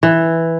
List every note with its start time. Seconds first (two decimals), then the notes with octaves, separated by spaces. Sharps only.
0.03 E3